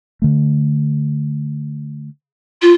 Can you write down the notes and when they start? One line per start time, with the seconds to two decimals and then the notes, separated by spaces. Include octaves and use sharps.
0.22 D3 A3
2.62 F4